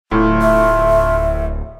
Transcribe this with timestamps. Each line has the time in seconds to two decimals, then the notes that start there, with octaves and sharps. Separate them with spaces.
0.11 D1 A2 A3 F4
0.41 E5